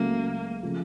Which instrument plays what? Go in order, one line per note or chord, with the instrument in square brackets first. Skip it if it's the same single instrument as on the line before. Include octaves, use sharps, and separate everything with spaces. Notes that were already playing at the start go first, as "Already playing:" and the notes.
Already playing: [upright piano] C#2 C#3 F#3 A3 [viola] A#3
[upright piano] C#3 F3 A3